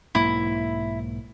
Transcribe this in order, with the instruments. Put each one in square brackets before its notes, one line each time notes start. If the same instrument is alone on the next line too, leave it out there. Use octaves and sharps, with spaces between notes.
[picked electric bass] B1 G#2 A#3 [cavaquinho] E4